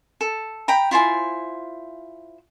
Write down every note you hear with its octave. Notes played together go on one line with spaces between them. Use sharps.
A4
G5 A#5 B5
E4 F4 C5 G#5